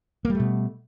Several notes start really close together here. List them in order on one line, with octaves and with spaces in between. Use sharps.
A#3 G3 A3 B2